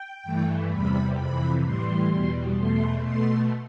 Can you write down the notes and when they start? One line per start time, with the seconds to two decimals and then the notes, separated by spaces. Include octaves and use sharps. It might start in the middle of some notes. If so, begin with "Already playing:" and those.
Already playing: G5
0.23 G2 E3 A3
0.70 E2 C3 G3 B5
1.16 F2 C3 E3 B5
1.63 A2 E3 G3 C6
2.10 E2 B2 G3
2.56 E2 B2 A3 C6
3.02 B2 A3 C6